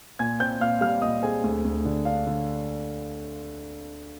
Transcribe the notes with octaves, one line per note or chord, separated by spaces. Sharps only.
A#2 G#5 G#6
C4 G5 G6
A#2 F5 F6
G3 F5 F6
A#2 D#5 D#6
C4 G#4 G#5
D2
D2
D3
D4 F5
D3